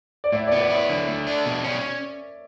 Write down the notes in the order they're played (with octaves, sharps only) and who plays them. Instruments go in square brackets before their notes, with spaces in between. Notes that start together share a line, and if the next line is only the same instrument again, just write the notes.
[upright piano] D5
[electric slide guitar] A2 [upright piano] E5
[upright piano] D5
[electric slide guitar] B3
[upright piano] D5
[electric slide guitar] E4
[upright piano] C#5
[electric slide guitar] D3
A3
D4
B2
C#4